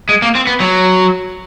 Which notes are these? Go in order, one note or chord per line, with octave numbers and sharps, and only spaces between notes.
G#3
A#3
C4
B3
F#3